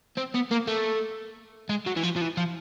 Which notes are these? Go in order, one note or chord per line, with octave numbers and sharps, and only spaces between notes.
C4
B3
A#3
A3
G#3
F#3
E3
F3
F3
E3
F3